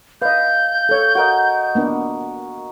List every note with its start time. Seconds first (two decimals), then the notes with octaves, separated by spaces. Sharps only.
0.22 B4 D#5 F5 G6
0.89 A4 C#5
1.15 F#4 A#4 D#5
1.75 A#3 B3 D4